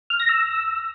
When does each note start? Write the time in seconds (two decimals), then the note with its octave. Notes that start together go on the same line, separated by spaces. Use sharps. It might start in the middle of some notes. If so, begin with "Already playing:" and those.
0.10 F6
0.20 A#6
0.29 E6